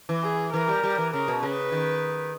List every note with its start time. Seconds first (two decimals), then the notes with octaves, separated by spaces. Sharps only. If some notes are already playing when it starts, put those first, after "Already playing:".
0.09 E3
0.23 G#4
0.53 E3 A#4
0.68 G3
0.83 G3
0.98 E3
1.13 C#3 A#4
1.28 B2
1.43 C#3 B4
1.72 D#3